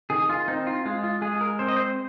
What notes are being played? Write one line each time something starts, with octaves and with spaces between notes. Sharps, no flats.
D#3 G#4
F4
C4 D#4
F4
G#3 F4
F4
G#3 G#4
A#4
C4 C5
D#5
C5